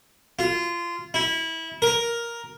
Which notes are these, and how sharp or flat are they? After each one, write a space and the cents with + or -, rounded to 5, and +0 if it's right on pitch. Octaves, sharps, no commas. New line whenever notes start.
F4 -20
E4 -20
A#4 +5